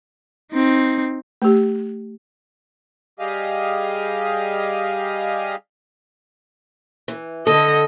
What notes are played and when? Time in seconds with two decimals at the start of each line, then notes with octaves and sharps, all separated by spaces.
0.52 C4 D#4
1.42 A3 G4
3.19 G3 G4 G#4 D#5 F5
7.08 E3
7.47 D3 A4 D#5